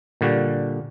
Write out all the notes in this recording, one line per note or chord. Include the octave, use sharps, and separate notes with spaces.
A#2 D3 G3 F#4